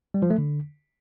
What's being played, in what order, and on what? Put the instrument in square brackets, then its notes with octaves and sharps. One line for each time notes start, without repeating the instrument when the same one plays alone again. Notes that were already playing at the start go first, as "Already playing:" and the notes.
[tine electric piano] G3
F3
A3
D3